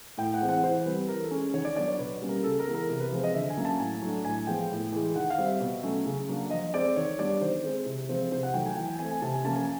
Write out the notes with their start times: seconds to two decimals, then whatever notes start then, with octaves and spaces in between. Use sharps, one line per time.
0.18 A2 G5
0.34 F#5
0.41 E3 G#3 C4
0.49 F#5
0.64 E3 C5
0.86 G3 C4 B4
1.09 E3 A#4
1.24 A4
1.31 G#3 C#4
1.54 D#3 C#5
1.65 D5
1.76 F#3 B3 D4 D5
1.88 C#5
1.99 B2 B4
2.21 G3 A#3 C#4
2.29 A#4
2.44 C#3 A4
2.59 A#4
2.66 E3 G#3 B3
2.74 A#4
2.89 C3 A#4
3.00 B4
3.12 F3 G#3 C4
3.24 D#5
3.34 D3 E5
3.50 G#5
3.57 F#3 A#3 C#4
3.65 A5
3.79 A2 G#5
4.02 F#3 A3 D4
4.25 A2 G#5
4.47 F3 G#3 B3 G5
4.71 A2
4.92 E3 G#3
5.16 D#3 F#5
5.30 F5
5.38 G3 C4
5.45 E5
5.61 B2
5.83 F#3 A3 C#4
6.06 C#3
6.29 F#3 A#3 D4
6.50 F3 D#5
6.73 G#3 C4 D5
6.96 D#3 C#5
7.18 G3 B3 D4 D5
7.41 D#3 C5
7.64 G#3 C4
7.86 C3
8.09 F3 G#3 C4
8.32 C3 C5
8.43 F#5
8.54 D#3 F#3 A3 G5
8.66 G#5
8.76 E3 G5
8.88 G#5
8.99 A3 C4 G#5
9.11 G#5
9.22 C3 A5
9.34 G#5
9.44 F3 A#3 C#4 A5
9.56 G#5